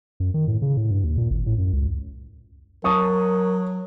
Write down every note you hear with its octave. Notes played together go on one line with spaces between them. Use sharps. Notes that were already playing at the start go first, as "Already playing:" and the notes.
F#2
D#3
A2
C#3
A2
G2
D#2
A#2
G#1
A2
F#2
C#2
F#3 A#4 A5 C#6 D#6